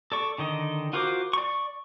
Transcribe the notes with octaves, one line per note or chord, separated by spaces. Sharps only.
A4 D5 C#6
D3 D#3 D#5
F4 F#4 A#4 C5 D6
D5 C#6